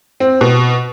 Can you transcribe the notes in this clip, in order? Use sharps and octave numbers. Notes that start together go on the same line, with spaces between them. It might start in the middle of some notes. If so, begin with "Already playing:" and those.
C4
B2